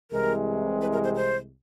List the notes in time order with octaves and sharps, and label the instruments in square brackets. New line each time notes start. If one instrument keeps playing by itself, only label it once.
[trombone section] C2 C3 E3 G#3 [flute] A#4
[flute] B4
A#4
C5
C5